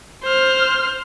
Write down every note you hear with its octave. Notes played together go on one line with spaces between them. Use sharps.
C5 F6